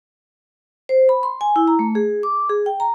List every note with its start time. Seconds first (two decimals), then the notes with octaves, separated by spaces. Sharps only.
0.89 C5
1.09 B5
1.23 C6
1.41 G#5
1.56 E4
1.68 A#5
1.79 A3
1.95 G#4
2.23 D6
2.50 G#4
2.66 G5
2.80 A#5